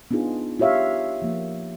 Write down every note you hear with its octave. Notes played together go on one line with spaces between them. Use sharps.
B3 D4 D#4 F4 G#4
F4 G4 C#5 E5 F5
F3 A#3